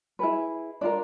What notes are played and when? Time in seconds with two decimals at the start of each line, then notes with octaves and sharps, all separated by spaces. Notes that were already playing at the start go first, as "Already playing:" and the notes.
0.19 E4 G#4 B4
0.81 D4 F4 A#4 D5